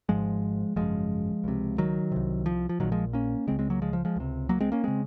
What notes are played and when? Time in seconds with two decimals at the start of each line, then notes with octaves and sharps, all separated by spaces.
0.09 G#1 G#2 F3 G#3
0.76 G#1 F#2 C#3 F3 G#3
1.44 C#2 C3
1.78 D#3 F#3
2.12 C2 C3
2.46 F3
2.69 F3
2.80 A#1 A#2 D#3 F#3
2.92 F3 G#3
3.13 A#3 C#4
3.47 C#3 G#3 C4
3.51 C#2
3.59 G#3 C4
3.70 F#3 A#3
3.82 F3 G#3
3.93 F3
4.05 F3 G#3
4.16 C#2 C3
4.49 F#3 A#3
4.60 G#3 C4
4.72 A#3 C#4
4.84 C#3 G#3 C4